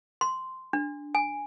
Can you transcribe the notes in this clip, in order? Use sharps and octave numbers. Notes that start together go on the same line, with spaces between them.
C6
D4
G#5